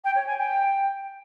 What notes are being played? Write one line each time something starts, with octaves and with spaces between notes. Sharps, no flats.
G5
C#5
G#5
G5